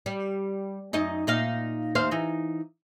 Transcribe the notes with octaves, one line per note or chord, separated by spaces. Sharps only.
G3
F#2 D#4 D#5
A#2 D#4 F5
D#2 C5 F5
E3 D#4